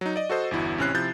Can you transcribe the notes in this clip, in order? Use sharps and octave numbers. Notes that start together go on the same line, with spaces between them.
F#3 D#4
D5 D#5
F#4 A4 C5 D#5
G1 E2 E4 F#4
A1 C3 C#4 E4 F#6 C7
C3 F3 E4 G6 A6